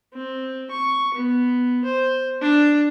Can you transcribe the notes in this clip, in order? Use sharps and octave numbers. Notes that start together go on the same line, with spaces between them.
C4
C#6
B3
C5
D4